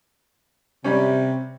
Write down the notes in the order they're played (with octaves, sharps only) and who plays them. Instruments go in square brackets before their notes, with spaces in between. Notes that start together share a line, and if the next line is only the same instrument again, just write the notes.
[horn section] C3 [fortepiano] G3 C#4